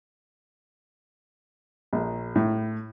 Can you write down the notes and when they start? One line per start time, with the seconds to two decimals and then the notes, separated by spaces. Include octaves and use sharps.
1.93 A#1
2.36 A2